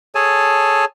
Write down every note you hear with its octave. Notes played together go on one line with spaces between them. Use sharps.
G#4 A4 C#5 G#5 A5